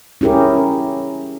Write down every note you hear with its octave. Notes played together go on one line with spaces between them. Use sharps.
C#4 E4 G4 G#4 A#4